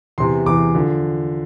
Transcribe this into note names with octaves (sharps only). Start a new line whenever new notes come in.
E2 C3 E3 C6
E2 C3 E3 D6
D3 F3